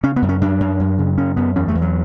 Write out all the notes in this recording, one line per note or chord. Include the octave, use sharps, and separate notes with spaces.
C#3 C#4
B3
F#2
C#4
F#2 D4
F#2
F#2
C#3
F#2 C#4
F#2 B3
E2 C#4
A3
E2
F#3